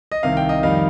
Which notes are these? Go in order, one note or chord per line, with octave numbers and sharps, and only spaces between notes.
D#5
C2 C3 D#3 F5
G5
D#5
F2 D#3 G3 D#4 F5